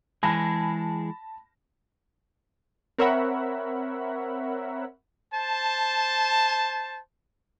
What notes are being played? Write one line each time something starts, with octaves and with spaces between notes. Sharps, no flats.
E3 G#3 G#4 A5 B5 A#6
C4 A#4 C#5 E5 F#5 B5
C5 A5